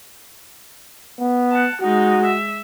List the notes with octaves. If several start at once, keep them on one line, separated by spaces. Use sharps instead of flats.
B3
F#5 A5
G#3 D#4 F#4
E5